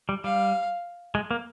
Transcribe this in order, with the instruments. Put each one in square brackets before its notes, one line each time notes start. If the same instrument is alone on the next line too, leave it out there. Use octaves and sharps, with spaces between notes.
[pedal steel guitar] G3
[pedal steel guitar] G3 [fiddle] F5
[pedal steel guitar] G#3
A#3